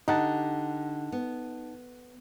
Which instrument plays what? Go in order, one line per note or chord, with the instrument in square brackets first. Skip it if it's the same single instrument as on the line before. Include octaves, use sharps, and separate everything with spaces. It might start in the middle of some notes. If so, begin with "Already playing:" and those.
[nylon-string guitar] D3 G4 [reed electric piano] D#4 F#5 A5
[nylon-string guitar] B3